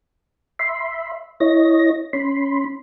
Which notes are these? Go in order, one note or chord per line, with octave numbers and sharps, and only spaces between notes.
E5 B5 C6
E4 C#5 D#5 A#6
C#4 B5 C6